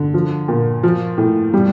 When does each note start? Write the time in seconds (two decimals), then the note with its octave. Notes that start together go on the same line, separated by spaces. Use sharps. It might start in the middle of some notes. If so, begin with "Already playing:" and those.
Already playing: D3
0.14 F3
0.48 A#2
0.83 F3
1.18 A2
1.54 G3